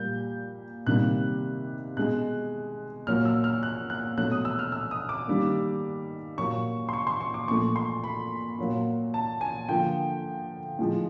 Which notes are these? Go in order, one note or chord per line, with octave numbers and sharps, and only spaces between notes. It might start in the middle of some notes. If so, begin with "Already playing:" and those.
Already playing: A#2 G3 A#3 G6
C3 D#3 G3 A#3 F#6
B2 G#3 F#6
A#2 F#3 A#3 F6
E6
F6
F#6
F#6
B2 F#3 A3 F#6
D#6
E6
F6
E6
D#6
D6
D#3 G3 A#3
A#2 F#3 A#3 C#6
C6
C#6
C6
C#6
D6
A#2 F3 A3 C#6
C6
B5
A#2 F#3 A#3
A5
G#5
D3 F3 A#3 G5
A2 F3 G#3